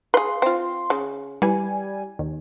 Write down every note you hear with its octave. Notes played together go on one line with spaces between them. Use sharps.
G#4 B4 F5 C6
C4 F4
C#3
E3 G3 G#5
D#2